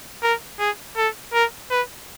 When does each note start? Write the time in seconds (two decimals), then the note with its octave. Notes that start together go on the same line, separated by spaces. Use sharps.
0.23 A#4
0.59 G#4
0.97 A4
1.33 A#4
1.70 B4